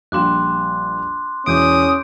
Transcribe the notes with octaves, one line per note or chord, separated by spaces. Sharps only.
A#1 G3 C6 D6 F#6 E7
E1 E3 C#4 D6 D#6 G6 D7